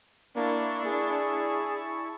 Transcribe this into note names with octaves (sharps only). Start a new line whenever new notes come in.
A#3 D4 E4 A5 C#6
G#4